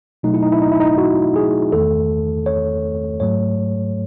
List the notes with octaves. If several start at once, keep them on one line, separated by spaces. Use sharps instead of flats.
B2 F#3 A3 D#4
E4
D#4
E4
D#4
E4
D#4
F#4
G#4
E2 D#3 A3 A4
C#5
G#2 F#3 A3 C#5